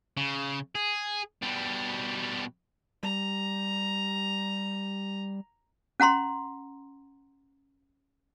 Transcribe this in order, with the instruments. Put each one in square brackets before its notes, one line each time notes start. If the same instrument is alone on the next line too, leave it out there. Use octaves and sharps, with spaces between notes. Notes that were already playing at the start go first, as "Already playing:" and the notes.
[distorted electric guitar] C#3
G#4
B2 G3
[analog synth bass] G3 [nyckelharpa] A#5
[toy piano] C#4 F#5 A#5 C6